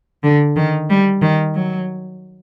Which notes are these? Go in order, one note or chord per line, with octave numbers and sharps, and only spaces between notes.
D3
D#3
G3
D#3
F#3